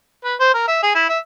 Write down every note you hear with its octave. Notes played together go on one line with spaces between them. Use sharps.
B4
C5
A#4
E5
G#4
E4
E5